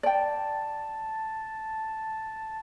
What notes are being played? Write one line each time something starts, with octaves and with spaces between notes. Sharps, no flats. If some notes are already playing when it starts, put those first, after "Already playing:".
D5 G5 A5